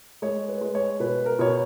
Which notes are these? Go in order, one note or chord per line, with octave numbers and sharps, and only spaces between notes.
G#3 C#5
B4
G#3
C#5
B2 B4
A#4
B2 C#5